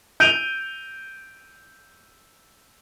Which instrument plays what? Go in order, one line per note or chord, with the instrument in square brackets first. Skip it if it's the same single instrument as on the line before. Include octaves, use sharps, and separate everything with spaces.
[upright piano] G6 D7 D#7 F7